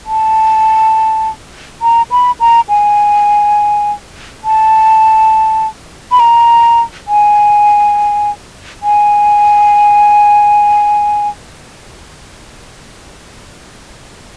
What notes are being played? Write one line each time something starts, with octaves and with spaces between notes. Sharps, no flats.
A5
A#5
B5
A#5
G#5
A5
B5
A#5
G#5
G#5